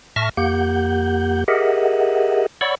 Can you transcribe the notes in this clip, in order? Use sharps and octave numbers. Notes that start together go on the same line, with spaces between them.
A2 E5 A5 C#6 F6 A#6
F2 A#3 G4 F#5 G6
G4 G#4 A#4 D#5 E5 F#5
C#5 D5 F#5 B5 C#6 E6